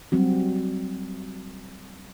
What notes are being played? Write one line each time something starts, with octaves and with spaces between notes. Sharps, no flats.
F#3 G3 C4 F#4